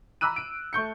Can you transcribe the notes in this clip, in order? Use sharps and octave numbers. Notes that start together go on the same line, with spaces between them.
A#5 B5 D6 E6 F#6 D#7
D7
A3 C#6 G6 C#7